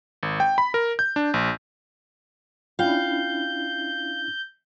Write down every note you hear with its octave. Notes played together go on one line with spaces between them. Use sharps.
G#1
G5
B5
A#4
G6
D4
A#1
C#4 D4 E4 F4 F5 G5 G6